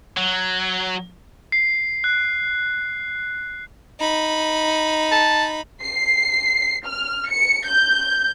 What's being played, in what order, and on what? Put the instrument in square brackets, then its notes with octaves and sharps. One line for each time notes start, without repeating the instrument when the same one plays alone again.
[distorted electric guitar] F#3
[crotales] C7
F#6
[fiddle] D#4 B5
[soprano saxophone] A5
[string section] C7
F6
C#7
G6